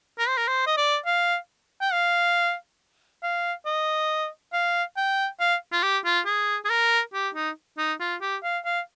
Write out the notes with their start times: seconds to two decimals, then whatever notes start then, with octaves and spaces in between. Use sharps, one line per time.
0.19 A#4
0.28 C5
0.37 A#4
0.48 C5
0.67 D#5
0.77 D5
1.06 F5
1.81 G5
1.93 F5
3.23 F5
3.66 D#5
4.53 F5
4.96 G5
5.40 F5
5.72 F4
5.83 G4
6.05 F4
6.26 G#4
6.65 G#4
6.70 A#4
7.14 G4
7.35 D#4
7.78 D#4
8.00 F4
8.21 G4
8.43 F5
8.65 F5